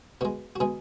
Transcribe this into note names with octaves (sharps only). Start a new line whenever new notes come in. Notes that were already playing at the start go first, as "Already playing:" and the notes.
B2 G#3 F#4
F#4
B2 G#3 G#4